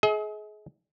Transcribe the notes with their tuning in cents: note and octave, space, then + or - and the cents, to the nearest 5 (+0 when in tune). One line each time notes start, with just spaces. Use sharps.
G#4 +30 D#5 +45